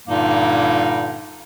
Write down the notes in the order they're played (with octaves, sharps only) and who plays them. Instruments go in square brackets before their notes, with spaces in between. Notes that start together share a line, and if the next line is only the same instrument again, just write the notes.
[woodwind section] G2 A#2 D3 G3 A#3 D#4